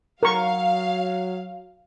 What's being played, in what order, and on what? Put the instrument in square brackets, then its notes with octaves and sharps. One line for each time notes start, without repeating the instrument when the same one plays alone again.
[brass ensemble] F#3 [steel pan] A#4 C#6 [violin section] F5